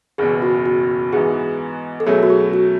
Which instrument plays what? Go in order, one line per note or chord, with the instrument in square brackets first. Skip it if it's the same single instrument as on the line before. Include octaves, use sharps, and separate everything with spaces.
[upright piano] F#1 E2 B2 [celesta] G#4
[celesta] F#4
F#4
[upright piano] G#2 E3 B3 F#4 [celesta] G#4
[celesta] A4
[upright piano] B2 F#3 A3 C#4 [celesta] G#4
[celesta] F#4
G#4
F#4